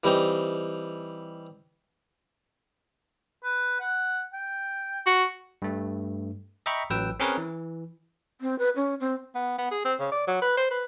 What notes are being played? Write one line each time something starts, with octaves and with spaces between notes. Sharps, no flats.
E3 G3 C4 D#4
B4
F#5
G5
F#4
G2 A3
D#5 E5 G5 A#5 B5 C#6
A1 F#3 B4 G5 E6
C4 C#4 G#4 A#4 B4 C#5
E3
C4
B4
C#4
C4
B3
B3
G#4
C4
C#3
D5
F#3
B4
C5
B4